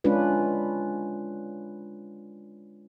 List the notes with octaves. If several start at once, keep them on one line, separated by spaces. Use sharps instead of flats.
G#3 C#4 D4 F4 B4